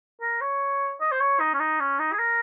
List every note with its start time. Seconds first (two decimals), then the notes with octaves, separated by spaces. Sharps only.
0.21 A#4
0.41 C#5
1.01 D#5
1.12 C5
1.20 C#5
1.40 D#4
1.54 C#4
1.60 D#4
1.80 C#4
1.99 D#4
2.12 G#4
2.19 A#4